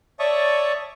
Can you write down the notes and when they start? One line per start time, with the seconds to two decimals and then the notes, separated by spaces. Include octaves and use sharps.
0.19 C#5 D5 E5 A5 C#6 D#6